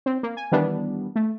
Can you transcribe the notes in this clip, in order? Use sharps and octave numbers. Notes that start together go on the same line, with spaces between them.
C4
A#3
G#5
D#3 E3 G3 B3 D4
A3